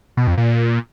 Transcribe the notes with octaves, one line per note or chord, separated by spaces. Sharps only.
B2
F2
A#2